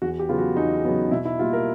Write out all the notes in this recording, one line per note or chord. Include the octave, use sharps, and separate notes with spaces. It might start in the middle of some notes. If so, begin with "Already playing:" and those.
E2 F#4
G4
C#3 F#3 B3 F4
F#4
E2 D#4
C#3 F#3 B3
B2 E4
E4
G3 A#3 F4
A#4